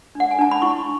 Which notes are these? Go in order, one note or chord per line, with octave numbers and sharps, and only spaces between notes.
D4 F#5
G#5
D4 A5
B5
E4 C#6